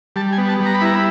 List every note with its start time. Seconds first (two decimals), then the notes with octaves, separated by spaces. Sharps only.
0.16 G3 A5
0.33 G#5
0.38 B3
0.49 A5
0.60 G3
0.66 A#5
0.74 B5
0.81 E4 A#5
0.95 B5